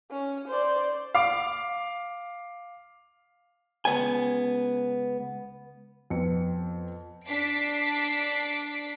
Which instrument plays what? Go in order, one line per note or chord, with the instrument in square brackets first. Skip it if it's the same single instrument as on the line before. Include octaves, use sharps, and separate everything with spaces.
[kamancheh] C#4
C5 D5
[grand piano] F5 D6
[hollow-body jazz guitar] C#2 B3 G#5
[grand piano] F2 B3 C#7
[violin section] D4 A5 D6 B6 C7 D7